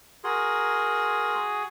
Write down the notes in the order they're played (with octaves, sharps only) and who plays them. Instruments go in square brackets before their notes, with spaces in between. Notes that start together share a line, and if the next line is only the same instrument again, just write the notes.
[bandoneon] F#4 G#4 [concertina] A#4 C6